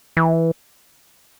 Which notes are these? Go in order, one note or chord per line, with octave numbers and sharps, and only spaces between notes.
E3